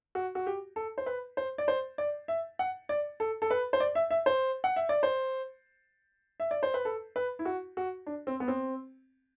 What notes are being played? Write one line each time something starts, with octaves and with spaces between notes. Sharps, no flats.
F#4
F#4
G4
A4
C5
B4
C5
D5
C5
D5
E5
F#5
D5
A4
A4
B4
C5
D5
E5
E5
C5
F#5
E5
D5
C5
E5
D5
C5
B4
A4
B4
E4
F#4
F#4
D4
C4
B3
C4